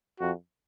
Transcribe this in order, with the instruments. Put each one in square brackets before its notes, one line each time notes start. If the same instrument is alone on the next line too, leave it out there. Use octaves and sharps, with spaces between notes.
[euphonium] F2 [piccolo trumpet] F#4